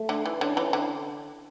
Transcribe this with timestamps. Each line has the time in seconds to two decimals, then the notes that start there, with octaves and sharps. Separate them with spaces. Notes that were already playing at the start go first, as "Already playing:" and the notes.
Already playing: A3
0.09 D3
0.26 E3
0.41 D3 C#4
0.57 E3
0.73 D3